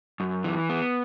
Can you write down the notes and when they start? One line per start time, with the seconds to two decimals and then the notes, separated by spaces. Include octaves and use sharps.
0.20 F#2
0.44 E3
0.69 B3